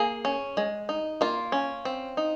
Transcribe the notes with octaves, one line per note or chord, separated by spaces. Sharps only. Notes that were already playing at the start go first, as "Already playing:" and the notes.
Already playing: A#3 G#4
C#4
G#3
D#4
A#3 F4
C#4
C4
D#4